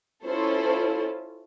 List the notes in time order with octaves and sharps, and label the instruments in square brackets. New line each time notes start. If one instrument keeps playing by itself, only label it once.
[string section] C#4 E4 F4 A4 C5